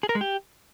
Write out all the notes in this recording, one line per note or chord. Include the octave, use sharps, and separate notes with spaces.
G#4
A#4
G#3
G4